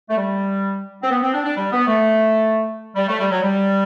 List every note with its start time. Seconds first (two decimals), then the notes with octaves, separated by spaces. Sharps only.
0.10 A3
0.17 G3
1.03 C4
1.11 B3
1.22 C4
1.34 D4
1.45 D4
1.57 G3
1.73 B3
1.87 A3
2.96 G3
3.08 A3
3.19 G3
3.31 F#3
3.43 G3